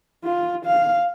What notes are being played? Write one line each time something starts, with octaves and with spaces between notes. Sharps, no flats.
F4
F5